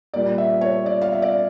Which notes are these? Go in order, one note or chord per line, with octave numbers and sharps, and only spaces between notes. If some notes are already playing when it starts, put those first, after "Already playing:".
A#2 G3 A#3 D5
E5
C#5
D5
F5
E5
D5